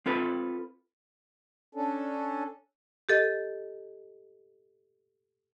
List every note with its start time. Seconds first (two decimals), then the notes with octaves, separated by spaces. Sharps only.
0.06 C4 F4 A4 B4
1.75 C#4 D4 A4
3.09 G4 A4 D#5